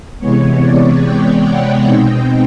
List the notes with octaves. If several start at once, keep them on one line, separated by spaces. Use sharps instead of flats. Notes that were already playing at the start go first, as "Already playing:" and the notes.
C3 E3 G#3 B3 C#5
D5
G5
F#5
B2 G#3 C4 D#4 G5